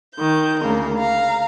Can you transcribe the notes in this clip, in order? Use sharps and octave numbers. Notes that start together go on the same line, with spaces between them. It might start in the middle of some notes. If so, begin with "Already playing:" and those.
D#3 G6
D2 C#3 A#3 A#4
F5 A#5